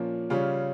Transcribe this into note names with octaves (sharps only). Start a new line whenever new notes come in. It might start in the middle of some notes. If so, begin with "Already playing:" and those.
Already playing: A#2 F3 A#3 C#4
C#3 G3 C#4 F4